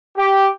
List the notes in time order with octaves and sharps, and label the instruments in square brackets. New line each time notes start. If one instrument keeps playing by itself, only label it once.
[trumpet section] G4